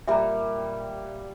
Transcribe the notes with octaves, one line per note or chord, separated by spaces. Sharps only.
A#2 G3 G4 E5 A#5